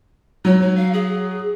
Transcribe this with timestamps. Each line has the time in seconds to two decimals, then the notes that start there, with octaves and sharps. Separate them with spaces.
0.45 F#3 C#5
0.61 D#4
0.75 F5
0.93 G#4